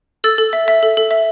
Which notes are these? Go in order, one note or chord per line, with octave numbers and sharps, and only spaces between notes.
A4 E6 A6
A4
E5
E5
A4
A4
E5